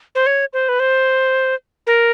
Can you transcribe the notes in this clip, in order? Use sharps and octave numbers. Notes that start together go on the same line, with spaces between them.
C5
C#5
C5
B4
C5
A#4